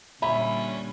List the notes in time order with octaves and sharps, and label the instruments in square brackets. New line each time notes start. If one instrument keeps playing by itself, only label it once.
[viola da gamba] A#2 D3 G3 [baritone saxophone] C#4 [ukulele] D4 E5 [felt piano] B5